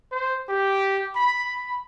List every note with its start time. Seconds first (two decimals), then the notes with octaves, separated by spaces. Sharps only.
0.12 C5
0.49 G4
1.15 B5